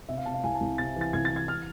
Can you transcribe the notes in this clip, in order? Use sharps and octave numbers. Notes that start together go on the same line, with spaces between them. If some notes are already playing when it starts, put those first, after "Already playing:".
C3 E5
F5
C3 A5
F5
C2 G#5
A5
C2
C3 A6
E3 A6
C2 G#6
A6
E3
G#6
F6